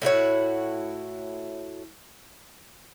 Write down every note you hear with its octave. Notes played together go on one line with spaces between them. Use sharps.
A2 E4 F#4 C#5